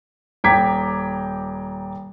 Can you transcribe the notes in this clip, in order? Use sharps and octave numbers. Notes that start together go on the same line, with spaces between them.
D#1 G5 A#5 D6 G#6 B6